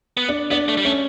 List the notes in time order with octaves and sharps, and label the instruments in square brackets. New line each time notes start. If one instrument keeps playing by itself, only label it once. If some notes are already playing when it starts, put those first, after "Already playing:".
[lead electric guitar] B3
[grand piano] D4
[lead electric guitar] B3 [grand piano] D4
[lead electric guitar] A3
G3
[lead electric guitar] A3 [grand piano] C#4